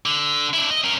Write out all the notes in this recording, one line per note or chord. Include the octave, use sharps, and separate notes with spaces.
D3
D4 E4
D#5
C#4 A#4